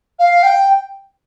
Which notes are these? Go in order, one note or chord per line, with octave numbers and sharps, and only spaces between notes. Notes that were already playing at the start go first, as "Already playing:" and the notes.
F5
G5